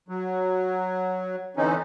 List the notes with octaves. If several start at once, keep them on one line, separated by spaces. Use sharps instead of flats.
F#3
D3 E3 C4 C#4 D#4